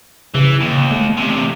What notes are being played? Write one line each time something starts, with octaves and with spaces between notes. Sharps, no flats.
C#3 E3
D#2
A3
E2 C3